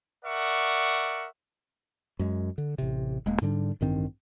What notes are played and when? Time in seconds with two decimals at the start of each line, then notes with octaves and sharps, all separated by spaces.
0.25 A#4 D5 E5 F#5 C#6
2.19 F#2 G#3
2.58 D3
2.78 A1 C3
3.26 E1 G#3 A#3
3.42 G#2 D3 G3 D4
3.81 A1 G2 D#3 C4